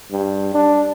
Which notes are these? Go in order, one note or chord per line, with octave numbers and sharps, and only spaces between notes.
G2
D4